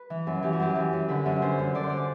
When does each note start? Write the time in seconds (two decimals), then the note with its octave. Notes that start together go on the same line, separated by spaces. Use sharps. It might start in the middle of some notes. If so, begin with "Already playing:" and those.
Already playing: B4
0.10 E3
0.27 F#2
0.43 E3 G4
0.53 F#4
0.60 F#2 G4
0.75 E3
0.93 F#2
1.08 D3 B4
1.26 F#2
1.42 D3 C5
1.59 F#2
1.75 D3 D5
1.83 C5
1.89 D5